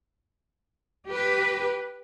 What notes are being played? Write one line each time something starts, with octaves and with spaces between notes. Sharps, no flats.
G4 B4